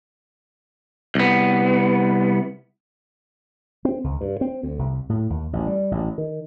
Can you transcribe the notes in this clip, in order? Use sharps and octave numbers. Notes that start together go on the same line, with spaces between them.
C2 B3
C4
C#2
G2
C4
D2
C2
A2
D#2
A1
G3
A1
D#3